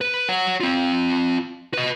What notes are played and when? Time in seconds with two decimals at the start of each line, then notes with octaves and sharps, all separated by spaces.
0.01 B4
0.29 C#5 F#5
0.60 C4 F4
1.74 B4 D#5